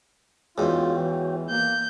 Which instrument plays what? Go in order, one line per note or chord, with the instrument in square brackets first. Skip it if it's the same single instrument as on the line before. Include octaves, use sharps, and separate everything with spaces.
[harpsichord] E2 G#2 [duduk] F4 [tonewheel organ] F#4 C#5 G5
[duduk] E3
[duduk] A#3 [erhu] G6